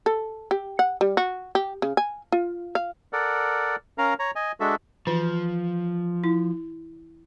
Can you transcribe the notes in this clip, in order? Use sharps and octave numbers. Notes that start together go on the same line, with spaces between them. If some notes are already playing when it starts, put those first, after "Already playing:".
A4
G4
F#5
G3
F#4
G4
C#3
G#5
F4
F5
A4 A#4 D5 F#5
C#4 A#4 F5 A#5
C#5 A#5
D#5 G#5
G#3 D4 F#4 A4 E5
E3 F3
E4